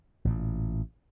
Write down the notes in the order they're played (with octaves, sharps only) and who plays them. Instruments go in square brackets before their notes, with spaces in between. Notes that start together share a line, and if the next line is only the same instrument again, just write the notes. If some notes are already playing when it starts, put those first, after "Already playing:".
[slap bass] A1 A#2